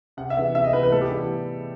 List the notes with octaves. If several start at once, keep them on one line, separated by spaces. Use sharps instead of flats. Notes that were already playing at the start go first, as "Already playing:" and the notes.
C3 F#5
E5
E3 B3
C3 E5
D#5
E3 B3 B4
B4
A2 A4
G4
E3 G3 B3